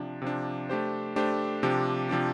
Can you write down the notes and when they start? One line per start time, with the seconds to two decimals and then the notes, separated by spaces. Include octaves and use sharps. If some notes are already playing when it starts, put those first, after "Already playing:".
Already playing: C3 F3 D4
0.22 C3 F3 D4
0.70 A3 D4 G4 C5
1.16 A3 D4 G4 C5
1.63 C3 F3 D4 G4
2.09 C3 F3 D4 G4